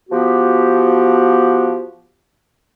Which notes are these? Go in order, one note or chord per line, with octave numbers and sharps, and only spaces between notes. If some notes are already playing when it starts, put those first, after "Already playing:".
F3 B3 F#4 G4